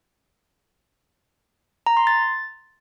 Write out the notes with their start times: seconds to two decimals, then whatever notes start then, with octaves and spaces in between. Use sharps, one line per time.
1.87 A#5
1.97 C6
2.07 A6